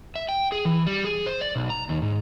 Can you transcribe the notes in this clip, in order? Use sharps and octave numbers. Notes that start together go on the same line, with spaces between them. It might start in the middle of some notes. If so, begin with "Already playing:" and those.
E5
G5
G#4
E3
G3
G#4
C5
D5
B1
A#5
D#2
G#2